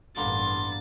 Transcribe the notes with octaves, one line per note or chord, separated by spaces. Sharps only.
A1 G2 D3 A#3 B3 C6 A6